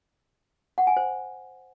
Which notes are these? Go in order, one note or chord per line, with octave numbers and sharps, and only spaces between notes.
F#5
G#5
C5